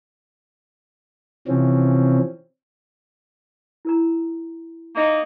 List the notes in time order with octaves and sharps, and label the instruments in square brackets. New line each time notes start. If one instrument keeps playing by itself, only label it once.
[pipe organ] C3 E3 F3 C4 C#4
[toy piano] E4 A#4 A#5
[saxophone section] A#3 D#4